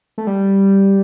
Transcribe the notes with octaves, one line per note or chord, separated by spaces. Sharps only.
A3
G3